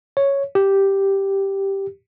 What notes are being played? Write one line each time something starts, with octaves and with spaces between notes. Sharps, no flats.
C#5
G4